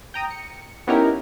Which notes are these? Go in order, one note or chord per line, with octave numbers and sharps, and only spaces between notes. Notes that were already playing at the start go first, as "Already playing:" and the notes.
G5 A#5 D#6
C#7
B3 C#4 D#4 E4 G4 A#4